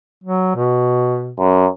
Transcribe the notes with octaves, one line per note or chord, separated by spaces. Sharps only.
F#3
B2
F#2